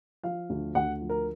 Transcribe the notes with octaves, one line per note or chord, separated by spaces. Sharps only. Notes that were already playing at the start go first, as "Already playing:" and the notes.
F3 F5
D2
D2 F#5
F3
A#4